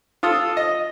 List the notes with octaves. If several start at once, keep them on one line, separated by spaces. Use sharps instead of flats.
F4 A4 D#6
D#5